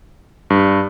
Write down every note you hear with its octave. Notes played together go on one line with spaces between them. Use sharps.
G2